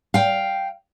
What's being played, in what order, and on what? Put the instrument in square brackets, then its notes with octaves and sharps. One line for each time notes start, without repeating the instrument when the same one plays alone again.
[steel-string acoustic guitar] F5 G5